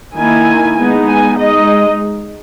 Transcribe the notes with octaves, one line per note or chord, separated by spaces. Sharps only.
D#3 A#3 E4 G#5
G#3 B3 D#4
G#5
G#3 D#4 D#5